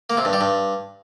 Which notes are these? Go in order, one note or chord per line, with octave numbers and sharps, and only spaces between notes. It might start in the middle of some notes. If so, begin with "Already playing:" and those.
A#3
C3
G2
G3
G2